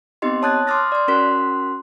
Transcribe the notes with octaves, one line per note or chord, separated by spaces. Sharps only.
B3 C4 D#4 G4 D#5 C6
C#5 A5 D#6 F#6 G#6 A6
C6 D6 D#6 F6 A6 A#6
D5 C6
C#4 F#4 A#4 C6 F#6 B6